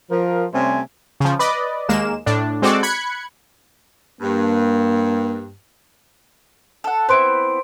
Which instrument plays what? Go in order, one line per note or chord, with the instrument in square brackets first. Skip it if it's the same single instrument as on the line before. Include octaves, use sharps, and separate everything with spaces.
[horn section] F3 A#4
C3 G3 A3 C#4 C5 G#5
[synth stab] C#3 F3
B4 D5 D#5
D#2 G#3 A#3 E7
A2 D4
G#3 C4 F#4 A4 D5
B5 F#6 G#6 C#7
[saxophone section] G2 [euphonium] A#3
[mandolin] A4 F#5
[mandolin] B3 C4 E4 [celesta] C5 C6 D7